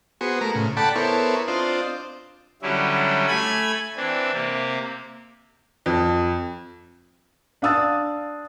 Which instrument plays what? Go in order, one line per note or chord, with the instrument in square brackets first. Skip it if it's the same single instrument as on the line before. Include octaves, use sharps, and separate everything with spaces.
[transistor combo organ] B3 F#4 G#4 C5
A3 A#4 A#5
A2 C#3
A4 D5 F#5 G5 A5 B5
B3 E4 A4 A#4 C5 C#5
C4 D4 F4 C5 D#5
[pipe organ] D3 F#3 G3 C#4 E4
A3 G#5 B5 G#6
E3 C4 D4
C3 A#3
[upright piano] F2
[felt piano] D4 F5 D#6 E6 A6